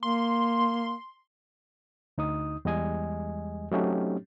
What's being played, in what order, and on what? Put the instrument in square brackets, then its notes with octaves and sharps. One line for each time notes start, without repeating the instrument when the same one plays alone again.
[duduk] A#3 [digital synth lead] C6
[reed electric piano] D2 D#4 D#6
E2 G3 G#3 D#5 G#5
F#3 A3 C4 C#4 D#4 G4